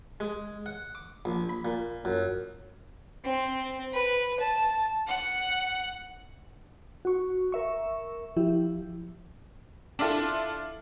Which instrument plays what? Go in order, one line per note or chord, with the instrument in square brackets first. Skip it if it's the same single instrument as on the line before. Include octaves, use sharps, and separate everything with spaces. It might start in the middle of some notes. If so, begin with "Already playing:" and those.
[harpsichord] G#3
F#5
D6
A#1
B5
A#2
F#2
[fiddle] C4
B4
A5
F#5
[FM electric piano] F#4 C#6
A#4 E5 C#6
F3 E4 G4
[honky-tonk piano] D4 E4 F4 A4